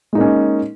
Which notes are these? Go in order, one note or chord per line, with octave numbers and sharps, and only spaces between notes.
G#3 A#3 C#4 D#4